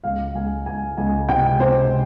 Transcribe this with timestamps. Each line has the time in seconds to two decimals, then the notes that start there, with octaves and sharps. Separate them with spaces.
0.04 C#2 F5
0.35 C#2 G#5
0.66 C#2 G#5
0.98 C#2 G#5
1.29 C3 G5
1.60 C3 C5